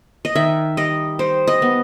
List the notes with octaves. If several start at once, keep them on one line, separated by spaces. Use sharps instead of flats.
D#5
D#3 E5
G3 D#5
G3 C5
D#5
B3